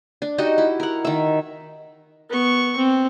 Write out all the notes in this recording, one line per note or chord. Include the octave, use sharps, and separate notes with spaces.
D4
D#4 F#4 G4 D#5
E4
A#4 F#5
D#3 E5
B3 C#6
C4